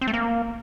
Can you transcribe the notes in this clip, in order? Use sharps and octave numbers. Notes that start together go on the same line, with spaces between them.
C4
A3
A#3